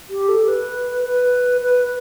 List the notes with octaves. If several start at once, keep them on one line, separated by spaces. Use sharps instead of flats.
G4
A4
B4
B4
B4